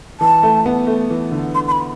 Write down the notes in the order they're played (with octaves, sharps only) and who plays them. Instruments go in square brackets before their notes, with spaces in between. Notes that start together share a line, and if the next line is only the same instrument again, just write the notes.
[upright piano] E3 [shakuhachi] A5
[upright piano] A3
B3
A3
E3
D3
[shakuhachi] C6
C6
B5